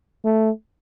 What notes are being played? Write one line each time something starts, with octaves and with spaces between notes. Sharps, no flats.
A3